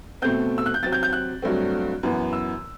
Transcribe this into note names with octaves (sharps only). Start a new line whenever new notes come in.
B2 A3 C4 G6
E6
F#6
G6
C3 F#3 C4 A6
G6
G6
F#6
G2 F#3 A3 C4
F#2 E3 B3
E6